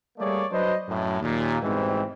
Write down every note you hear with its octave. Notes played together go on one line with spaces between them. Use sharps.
G3 A3 A#3 G#4 C#5 D5
F#3 D4 B4 C5 D#5
F#2 A2
D#2 A#2
G#2 B2 E3 G3 C4